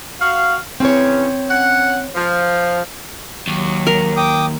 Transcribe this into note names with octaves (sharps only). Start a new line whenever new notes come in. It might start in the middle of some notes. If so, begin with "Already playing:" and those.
F#4 F5
C#3 E3 C4 C#4 C#5
C#4 F#5
F3
D#2 F#3
A#4
G5 D6 D#6